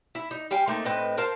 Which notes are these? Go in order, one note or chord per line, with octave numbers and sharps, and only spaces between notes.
E4
D#4
G3 F5 G5 G#5
A3 A#3 C4 D#4
A2 C4 B4 D#5
A#4 C5 F5 A5